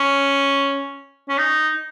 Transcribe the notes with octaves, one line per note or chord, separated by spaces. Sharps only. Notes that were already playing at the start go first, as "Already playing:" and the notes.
Already playing: C#4
C#4
D#4